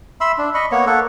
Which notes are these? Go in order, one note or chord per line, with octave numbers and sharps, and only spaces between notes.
E5 B5 C6 E6
D4
D#5 B5 C#6
A#3 B3 C#5 C#6
A#3 A4 F#5 C#6